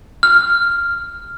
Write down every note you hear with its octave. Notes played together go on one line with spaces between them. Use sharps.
F6